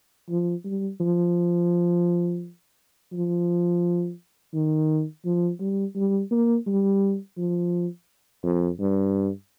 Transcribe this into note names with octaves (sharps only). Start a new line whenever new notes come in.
F3
G3
F3
F3
D#3
F3
G3
G3
A#3
G3
F3
F2
G2